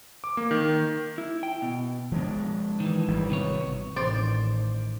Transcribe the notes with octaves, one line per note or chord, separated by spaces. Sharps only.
D6
A#3
D#3
E4
G5
B2
F3 G#3 D4
D#3 E3
G#1 G3
C3 B3 C#5
A1 D#3 C5 D5